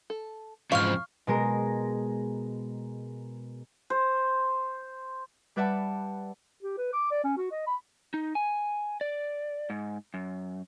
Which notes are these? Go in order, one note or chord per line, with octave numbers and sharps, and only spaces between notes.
A4
F2 G#2 C#3 E3 F3 F5 C#6 F6
B2 G#3 A#4
C5
G3 B4 D5 E5 F#5 A5
G4
B4
D6
D5
C#4
F#4
D#5
B5
D#4
G#5
D5
G#2
F#2